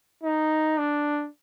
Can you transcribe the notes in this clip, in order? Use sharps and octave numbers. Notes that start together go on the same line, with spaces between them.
D#4
D4